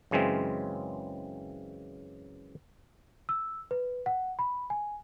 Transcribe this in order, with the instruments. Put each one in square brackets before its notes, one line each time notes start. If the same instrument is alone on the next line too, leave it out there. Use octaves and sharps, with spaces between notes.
[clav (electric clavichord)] F#2 C#3 E3 G#3 C4
[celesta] E6
B4
F#5
B5
G#5